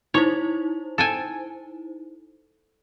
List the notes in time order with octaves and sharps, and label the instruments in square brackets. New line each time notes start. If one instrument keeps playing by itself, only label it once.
[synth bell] D#4 E4 C5 [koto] C#5
[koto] A4 G5 G#5